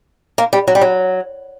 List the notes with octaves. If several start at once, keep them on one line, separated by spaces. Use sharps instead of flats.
A#3
G3
F#3
G3
F#3